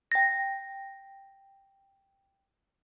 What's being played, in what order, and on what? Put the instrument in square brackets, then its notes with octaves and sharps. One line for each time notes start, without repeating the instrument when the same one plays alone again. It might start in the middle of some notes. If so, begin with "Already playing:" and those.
[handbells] G5 A#6